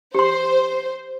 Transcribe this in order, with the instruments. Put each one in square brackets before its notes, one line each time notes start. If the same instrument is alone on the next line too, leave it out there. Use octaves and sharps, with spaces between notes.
[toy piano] G4 C6 [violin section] C5